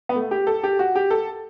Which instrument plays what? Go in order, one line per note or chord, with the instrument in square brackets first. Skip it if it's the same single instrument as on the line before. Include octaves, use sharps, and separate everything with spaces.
[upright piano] B3
A3
G4
A4
G4
F#4
G4
A4